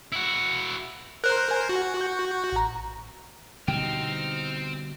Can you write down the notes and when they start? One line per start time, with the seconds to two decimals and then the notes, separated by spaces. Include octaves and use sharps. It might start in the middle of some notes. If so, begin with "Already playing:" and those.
0.12 E4 F#4
1.24 A#4 C5 F#6
1.51 G#5
1.69 F#4
1.97 C#6 G6
2.53 A1 A#5
3.68 B2 D3 G3 C4 D#4 G5 F6